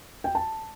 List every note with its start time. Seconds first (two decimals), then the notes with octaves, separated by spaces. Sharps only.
0.24 G5
0.35 A5